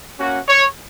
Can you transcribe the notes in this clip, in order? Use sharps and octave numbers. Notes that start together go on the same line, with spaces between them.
A#3 C#4 F#4
C#5